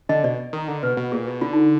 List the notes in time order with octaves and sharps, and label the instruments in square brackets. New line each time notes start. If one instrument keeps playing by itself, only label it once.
[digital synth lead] D3 [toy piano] D#5
[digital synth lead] B2 [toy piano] D5
[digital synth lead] D#3
D3
[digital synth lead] B2 [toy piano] B4
[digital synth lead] B2
[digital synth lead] A#2 [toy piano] G#4
[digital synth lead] B2
[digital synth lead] D3 [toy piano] F4
[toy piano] D#4